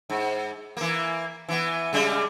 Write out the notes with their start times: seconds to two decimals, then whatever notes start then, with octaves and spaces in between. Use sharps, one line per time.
0.10 G#2
0.77 E3 A#3
1.49 E3 B3
1.93 C#3 G3 G#3